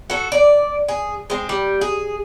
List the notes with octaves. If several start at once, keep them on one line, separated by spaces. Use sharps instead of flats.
F#4 A4
D5
G#4
G#3 C4
G3
G#4